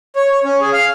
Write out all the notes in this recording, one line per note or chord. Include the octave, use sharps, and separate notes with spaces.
C#5
C#5
C#4
G#4
F5